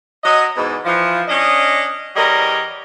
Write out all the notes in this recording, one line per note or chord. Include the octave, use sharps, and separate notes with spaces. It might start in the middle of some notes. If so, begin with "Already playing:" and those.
F#3 D#5
E2 G#2 B2
E3 F3
C#4 D4 D#5
E2 G3 A#4 C#5 D#5